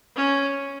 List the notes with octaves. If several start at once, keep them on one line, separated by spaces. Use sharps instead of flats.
C#4